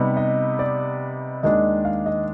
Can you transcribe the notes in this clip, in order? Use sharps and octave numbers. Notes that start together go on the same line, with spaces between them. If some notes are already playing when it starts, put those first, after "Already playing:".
Already playing: C3 G3 B3 D#4
D#5
D5
D#2 D#3 G#3 D4 D#5
F5
D#5